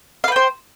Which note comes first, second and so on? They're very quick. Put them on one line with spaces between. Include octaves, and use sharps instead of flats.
F5 B4 G5 C5